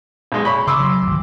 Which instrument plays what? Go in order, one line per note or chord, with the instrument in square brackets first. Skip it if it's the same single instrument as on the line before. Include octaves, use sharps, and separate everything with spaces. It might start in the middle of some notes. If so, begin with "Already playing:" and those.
[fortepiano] B1 G#3
C#5 B5
[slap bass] C#3 [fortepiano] C6 D6 E6
[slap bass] F#3
G#1 D2